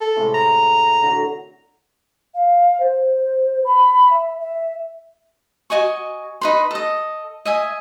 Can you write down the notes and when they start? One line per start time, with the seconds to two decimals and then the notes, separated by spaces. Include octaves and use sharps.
0.01 A4
0.16 A2 C3 G#3
0.34 A#5
1.03 D3 F#3
2.34 F5
2.80 C5
3.64 B5
4.10 E5
4.40 E5
5.70 F#4 D#5 G#5 C#6
6.41 D#4 B4 C6
6.71 A4 D#5
7.45 D#5 E5 G#5